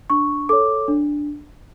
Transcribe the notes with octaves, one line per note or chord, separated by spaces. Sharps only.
D4 C#6
A4 C#5 D6
D4